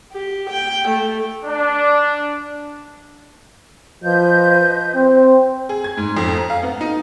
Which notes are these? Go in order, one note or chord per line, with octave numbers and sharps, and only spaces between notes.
G4
G5
A3
D4
F3 B4 D#5 G6
C4
G#4
G#6
G#2
F2
A#5
F5
B3
D#4